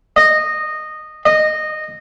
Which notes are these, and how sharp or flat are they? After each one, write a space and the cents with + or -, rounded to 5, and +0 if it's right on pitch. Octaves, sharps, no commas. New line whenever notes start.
D#5 -15
D#5 -15